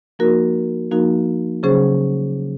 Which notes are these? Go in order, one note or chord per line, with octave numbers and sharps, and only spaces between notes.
F3 A#3 D#4 F#4 A#4
F3 A#3 D#4 F#4 A#4
C#3 F#3 C#4 G#4 C5